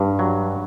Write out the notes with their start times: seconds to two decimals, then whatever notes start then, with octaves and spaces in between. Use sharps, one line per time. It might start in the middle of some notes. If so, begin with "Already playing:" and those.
Already playing: G2
0.19 F#3